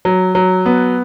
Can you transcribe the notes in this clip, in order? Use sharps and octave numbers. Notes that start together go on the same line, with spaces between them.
F#3
F#3
B3